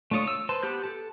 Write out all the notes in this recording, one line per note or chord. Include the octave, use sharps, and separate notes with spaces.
A3 D4 F4 C#5 D#6
E6
B4 C5 A5 C6
B3 G4 F#6 G6
A4 A5